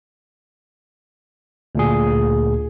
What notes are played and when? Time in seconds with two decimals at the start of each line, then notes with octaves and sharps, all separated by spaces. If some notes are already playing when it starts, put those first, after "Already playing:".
1.75 D2 A#2 G#4